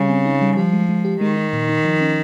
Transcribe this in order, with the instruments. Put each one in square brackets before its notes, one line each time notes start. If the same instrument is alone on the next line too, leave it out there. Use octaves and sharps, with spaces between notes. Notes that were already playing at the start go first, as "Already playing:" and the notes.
Already playing: [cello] C#3 [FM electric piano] G3
[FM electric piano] C4
D#4
G3
[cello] F3 [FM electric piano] G4
[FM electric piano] G#3
G#3
G4
[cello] D#3 [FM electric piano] G#3
[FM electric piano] D#4
A#2
D#4
F3
C#4